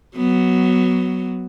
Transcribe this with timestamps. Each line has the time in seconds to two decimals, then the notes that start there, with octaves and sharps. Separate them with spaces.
0.16 F#3 B3